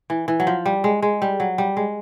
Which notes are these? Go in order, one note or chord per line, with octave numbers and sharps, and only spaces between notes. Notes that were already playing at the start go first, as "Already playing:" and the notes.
E3
E3
F#3
F3
G3
G#3
G#3
G3
F#3
G3
G#3